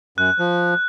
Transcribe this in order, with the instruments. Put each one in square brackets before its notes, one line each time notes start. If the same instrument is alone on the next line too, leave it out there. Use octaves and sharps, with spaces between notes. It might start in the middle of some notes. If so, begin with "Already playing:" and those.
[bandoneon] F#2 [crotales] F#6
[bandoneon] F3